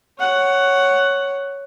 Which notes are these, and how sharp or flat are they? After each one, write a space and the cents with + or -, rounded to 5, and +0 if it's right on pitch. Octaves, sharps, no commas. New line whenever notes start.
C#5 +0 F#5 +10